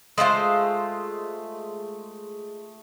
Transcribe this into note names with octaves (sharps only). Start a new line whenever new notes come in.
G#3 A3 F4 C5